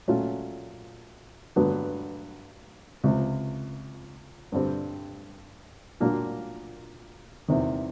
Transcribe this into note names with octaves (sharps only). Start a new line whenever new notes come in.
A#2 F#3 A3 C#4 F4
G2 D3 F#3 B3 D4
C#2 C3 F3
G2 D3 G3 C4
A#2 F#3 A#3 D4 F4
E2 C3 D#3